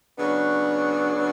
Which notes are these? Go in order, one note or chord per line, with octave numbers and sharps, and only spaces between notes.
C#3 F#3 B3 D4